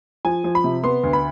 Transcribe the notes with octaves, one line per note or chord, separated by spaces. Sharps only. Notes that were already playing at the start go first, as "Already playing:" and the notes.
F3 G#5
F3
B5
C3
B3 C6
D2
B5